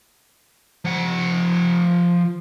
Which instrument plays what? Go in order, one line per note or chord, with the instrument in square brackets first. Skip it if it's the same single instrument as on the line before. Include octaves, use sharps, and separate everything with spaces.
[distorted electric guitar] F3 F#5